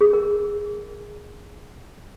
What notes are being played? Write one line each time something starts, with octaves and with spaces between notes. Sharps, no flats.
G#4
A#4